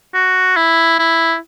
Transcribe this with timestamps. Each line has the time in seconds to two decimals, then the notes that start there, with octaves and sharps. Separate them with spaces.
0.14 F#4
0.57 E4
0.99 E4